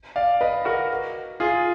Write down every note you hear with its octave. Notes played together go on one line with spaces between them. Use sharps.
D5 F5
B4 D#5
F#4 A#4
F4 G#4